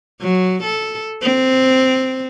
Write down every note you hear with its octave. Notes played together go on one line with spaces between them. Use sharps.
F#3
A4
C4